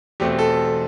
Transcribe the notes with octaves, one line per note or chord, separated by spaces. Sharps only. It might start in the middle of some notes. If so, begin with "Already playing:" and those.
E2 B2 A3 C4 G4
A4